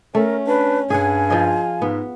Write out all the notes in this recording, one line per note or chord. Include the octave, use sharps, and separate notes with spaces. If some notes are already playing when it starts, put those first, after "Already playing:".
A3 C#4 A#4
D4 B4
G2 G#4 F#5 G#5
F3 F4 G#4 D#5
G#2 B3